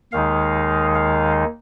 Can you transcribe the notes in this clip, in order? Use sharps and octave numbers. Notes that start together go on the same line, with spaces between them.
D#2 D#3 G#3 D#4 F5
F5